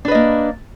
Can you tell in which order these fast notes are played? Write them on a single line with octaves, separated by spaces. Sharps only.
D4 B4 D#5 A#3